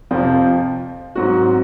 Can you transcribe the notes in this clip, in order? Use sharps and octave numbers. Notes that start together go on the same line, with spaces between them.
F2 C3 F3 C4 F4
G#2 F#3 C4 F#4